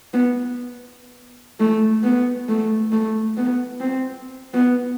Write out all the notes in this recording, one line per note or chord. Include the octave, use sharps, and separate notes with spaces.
B3
A3
B3
A3
A3
B3
C4
B3